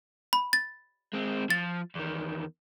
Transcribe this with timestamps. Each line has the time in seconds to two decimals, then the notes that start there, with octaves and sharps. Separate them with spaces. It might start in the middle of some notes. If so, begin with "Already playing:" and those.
0.33 B5
0.53 A6
1.14 G#3 C4
1.50 F3 A6
1.95 E2 D#3